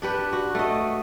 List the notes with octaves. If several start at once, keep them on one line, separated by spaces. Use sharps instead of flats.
D4 G4 B4
F#4
A3 D#5